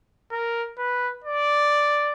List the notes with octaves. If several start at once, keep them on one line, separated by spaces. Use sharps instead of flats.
A#4
B4
D5